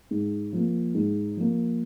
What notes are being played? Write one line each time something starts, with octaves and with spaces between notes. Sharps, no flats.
G#2
F3 A#3
G#2
F3 A#3